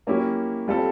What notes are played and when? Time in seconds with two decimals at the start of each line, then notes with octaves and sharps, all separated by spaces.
0.07 F#3 A#3 C#4 E4 G4
0.68 G3 C4 F4 A4